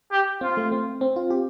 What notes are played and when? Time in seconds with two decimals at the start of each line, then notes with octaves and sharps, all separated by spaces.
0.11 G4
0.41 C4 F4
0.57 A3
0.72 C4
1.01 C4
1.16 F4
1.30 G4